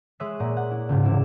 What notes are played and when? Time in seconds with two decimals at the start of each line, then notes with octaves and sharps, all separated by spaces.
0.20 G#3 C#5 E5 D#6 F#6 B6
0.40 A#2 A#3 F#5
0.57 F#5
0.71 E4
0.89 C#2 G#2
1.04 E1 C3 E4 D5 E7